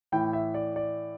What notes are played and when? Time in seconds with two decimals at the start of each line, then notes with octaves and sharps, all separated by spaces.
0.12 A2 E3 G5
0.33 E5
0.54 D5
0.76 D5